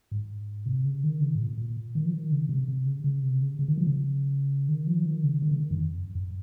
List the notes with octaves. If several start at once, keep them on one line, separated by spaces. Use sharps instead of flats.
G#2
C3
C#3
D#3
C#3
G#2
A#2
A#2
D#3
F3
D#3
C#3
C3
C3
C#3
C#3
C3
C#3
C#3
D#3
F3
C#3
D#3
F3
D#3
C#3
D#3
C#3
D#3
F#2
F2
F#2
F#2